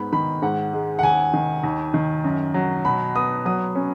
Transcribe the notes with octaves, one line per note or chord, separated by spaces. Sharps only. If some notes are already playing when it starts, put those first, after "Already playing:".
Already playing: G#2 B3 B5
D#3 B5
G#2 F#5
G#3
F#5
D#2 G#5
D#3
D#2
D#3
F#2
F#3
B2 B5
B3 D#6
F#3 D#6
C#4